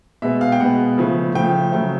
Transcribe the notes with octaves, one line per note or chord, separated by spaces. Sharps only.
B2 G#3 B3 E5
F5
G5
B2 G#3 B3 F#5
C#3 F3 A3
C#3 F3 A3 G5
C#3 F#3 A3